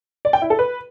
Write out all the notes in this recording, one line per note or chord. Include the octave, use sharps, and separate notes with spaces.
D5
G5
E4
A4
B4